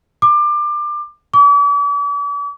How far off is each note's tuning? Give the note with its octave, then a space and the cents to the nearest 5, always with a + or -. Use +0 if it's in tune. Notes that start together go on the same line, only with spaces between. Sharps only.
D6 +25
D6 -45